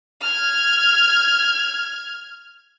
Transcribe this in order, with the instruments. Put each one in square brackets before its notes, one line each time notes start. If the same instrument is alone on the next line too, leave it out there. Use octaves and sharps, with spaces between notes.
[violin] F6 G#6